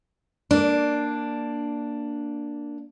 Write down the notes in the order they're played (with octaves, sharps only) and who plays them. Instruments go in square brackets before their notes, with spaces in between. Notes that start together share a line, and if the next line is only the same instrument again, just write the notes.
[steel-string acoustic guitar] A#3 D4